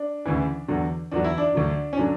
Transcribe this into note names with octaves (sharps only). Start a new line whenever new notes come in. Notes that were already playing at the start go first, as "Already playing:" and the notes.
Already playing: D4
D2 C#3 E3
E2 D3 F#3
E2 D3 F#3 D4
E4
D4
D2 D3 F#3
C#4
D3 F#3 D4